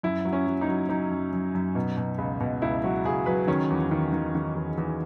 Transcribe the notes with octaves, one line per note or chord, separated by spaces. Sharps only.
F#2 E4
F#3
C#4
F#3
D#4
F#3
F#3 D#4
F#2
F#2
F#2
B2
B2
C#2
B2
C#2 E4
F#3 F#4
C#2 G#4
F#3 B4
D#3 C#4
E2
D#3
D#3
D#3
E2
E2